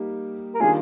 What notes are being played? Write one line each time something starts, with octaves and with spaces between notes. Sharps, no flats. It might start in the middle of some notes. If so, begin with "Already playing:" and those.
Already playing: G3 A#3 D#4 G4
A#4
D#3 G3 A#3 D4 F4 G#4